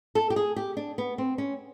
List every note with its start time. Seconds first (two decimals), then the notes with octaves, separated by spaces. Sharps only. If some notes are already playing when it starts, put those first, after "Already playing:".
0.15 A4
0.30 G4
0.36 G#4
0.56 G4
0.77 D4
0.98 B3
1.18 C4
1.38 C#4